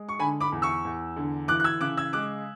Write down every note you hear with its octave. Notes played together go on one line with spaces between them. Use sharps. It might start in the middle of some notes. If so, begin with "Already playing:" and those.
Already playing: G#3
C#6
D3 G#5 B5
B5 D6
E2
C#6 E6
E2
D3
E3 D6 F#6
F#6
E6 G#6
C#3 D6 F#6
E6 G#6
G#3 D6 F#6